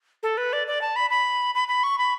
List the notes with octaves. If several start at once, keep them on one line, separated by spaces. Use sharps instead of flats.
A4
B4
D5
D5
A5
B5
B5
B5
B5
C#6
B5